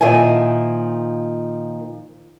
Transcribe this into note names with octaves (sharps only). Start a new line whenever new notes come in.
A#2 D#3 F3 E4 G#5